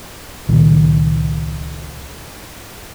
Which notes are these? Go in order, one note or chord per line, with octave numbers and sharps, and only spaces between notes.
C#2 A#2 D#3 F#3